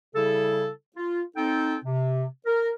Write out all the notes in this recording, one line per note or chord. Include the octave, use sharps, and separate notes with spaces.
C#3 G3 E4 G#4 A4
F4
C4 D#4 A4 G5
C3
A#4